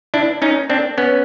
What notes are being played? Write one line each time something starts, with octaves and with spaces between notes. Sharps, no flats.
D4 E4
C#4 D#4
C4 D4
B3 C#4